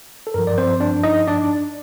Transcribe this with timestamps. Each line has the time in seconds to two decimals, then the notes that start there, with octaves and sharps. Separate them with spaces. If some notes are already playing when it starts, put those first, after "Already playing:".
0.27 A4
0.34 G2 F3 A#4
0.47 D5
0.58 C4 C5
0.80 D4 D5
1.03 D#4 D#5
1.28 D4 D5